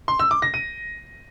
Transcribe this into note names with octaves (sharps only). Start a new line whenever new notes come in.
C6
E6
D6
A#6
D#7